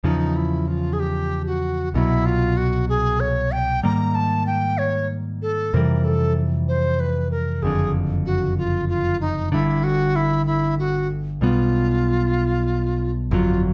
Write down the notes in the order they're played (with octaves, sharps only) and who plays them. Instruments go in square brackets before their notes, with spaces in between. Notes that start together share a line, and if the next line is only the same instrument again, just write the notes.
[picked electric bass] E2 C#3 F3 [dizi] D#4
[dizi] E4
F4
G#4
G4
F#4
[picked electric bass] C2 B2 F#3 [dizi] E4
[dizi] F4
F#4
G#4
C#5
G5
[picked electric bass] G#2 D#3 G3 A#3 [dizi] A#5
[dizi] A5
G5
C#5
A4
[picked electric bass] F2 C3 E3 G3 [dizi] A#4
[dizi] A4
C5
B4
A#4
[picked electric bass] F#1 F2 D3 [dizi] G#4
[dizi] F#4
F4
F4
D#4
[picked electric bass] G1 G2 D3 [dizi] E4
[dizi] F#4
E4
E4
F#4
[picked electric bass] B1 B2 G3 B3 [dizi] F4
[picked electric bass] G1 F2 C#3 F#3 [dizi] F4